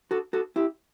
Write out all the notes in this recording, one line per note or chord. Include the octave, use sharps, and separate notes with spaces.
F#4 A4
F#4 A4
E4 G4